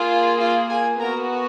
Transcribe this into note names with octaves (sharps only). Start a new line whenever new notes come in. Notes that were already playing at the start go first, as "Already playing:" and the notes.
Already playing: A#3 F4 G#4
F4 F5
G#4 G#5
B3 F#4 A#4 A#5